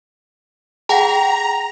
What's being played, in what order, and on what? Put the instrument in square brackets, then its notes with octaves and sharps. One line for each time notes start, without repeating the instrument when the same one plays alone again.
[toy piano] G#4 F#5 [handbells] G5 A5 [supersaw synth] A#5